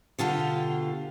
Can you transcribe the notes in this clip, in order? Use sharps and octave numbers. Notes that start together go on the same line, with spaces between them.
B2 D3 F4 G4